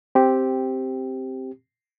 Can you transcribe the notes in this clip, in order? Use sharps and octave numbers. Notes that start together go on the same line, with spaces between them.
C4 G4